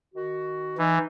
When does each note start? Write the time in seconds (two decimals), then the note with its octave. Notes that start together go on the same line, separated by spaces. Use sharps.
0.14 D#3 F#4
0.78 E3 D#4